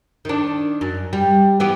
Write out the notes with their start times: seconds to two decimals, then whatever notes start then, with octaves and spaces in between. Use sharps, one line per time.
0.25 D#3 D4
0.81 F#2
1.13 G3
1.60 E3 B3 G4